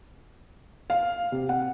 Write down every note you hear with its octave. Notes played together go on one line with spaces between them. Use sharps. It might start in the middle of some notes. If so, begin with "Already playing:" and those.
F5
C3
F#5